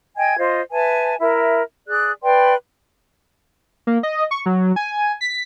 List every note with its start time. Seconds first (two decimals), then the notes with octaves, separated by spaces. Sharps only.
0.17 D#5 G5 G#5 G#6
0.38 F4 C5 D#5
0.71 B4 E5 G#5 A5
1.19 E4 A#4 E5
1.87 G#4 D5 F#6
2.22 B4 D5 G5 C6
3.87 A#3
4.03 D#5
4.31 C#6
4.46 F#3
4.76 G#5
5.21 B6